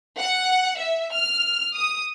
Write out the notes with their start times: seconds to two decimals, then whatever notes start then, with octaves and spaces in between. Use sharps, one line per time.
0.19 F#5
0.79 E5
1.13 F6
1.76 D#6